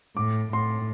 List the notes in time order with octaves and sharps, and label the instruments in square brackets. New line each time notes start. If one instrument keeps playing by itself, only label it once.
[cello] A2 [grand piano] D6
[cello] A2 [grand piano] C6